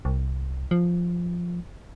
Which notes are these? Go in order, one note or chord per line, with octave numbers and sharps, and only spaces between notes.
C2
F3